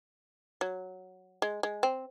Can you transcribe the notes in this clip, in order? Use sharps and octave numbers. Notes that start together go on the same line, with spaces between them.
F#3
G#3
G#3
C4